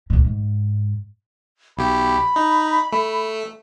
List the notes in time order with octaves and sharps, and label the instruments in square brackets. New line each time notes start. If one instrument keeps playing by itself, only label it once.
[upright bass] D2 A#2
G#2
[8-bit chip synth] B1 G4 [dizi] B5
[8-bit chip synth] D#4
A3